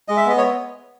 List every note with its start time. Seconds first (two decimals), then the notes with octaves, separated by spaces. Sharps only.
0.08 G#3 D#5
0.17 E5
0.26 B3 D#5
0.38 C#5